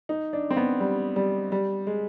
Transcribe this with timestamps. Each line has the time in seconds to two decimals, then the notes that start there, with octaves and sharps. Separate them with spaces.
0.09 D#4
0.33 D4
0.50 C4
0.57 B3
0.80 G3
1.16 G3
1.52 G3
1.87 G#3